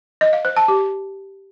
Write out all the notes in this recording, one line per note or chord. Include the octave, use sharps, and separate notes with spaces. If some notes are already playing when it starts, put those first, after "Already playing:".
D#5
F5
C5
A5
G4